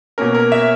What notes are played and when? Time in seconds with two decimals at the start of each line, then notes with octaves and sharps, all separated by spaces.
0.18 B2 A#3 C#4 A#4
0.35 A#4
0.52 E5